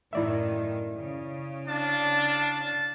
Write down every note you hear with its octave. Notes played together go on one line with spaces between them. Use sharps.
F#2 A2 D#3 E4 D5 E5
C#3
D4 F5 A5